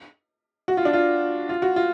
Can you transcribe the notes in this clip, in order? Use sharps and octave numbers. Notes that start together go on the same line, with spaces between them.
F#4
F4
D4
F4
F4
F#4
F4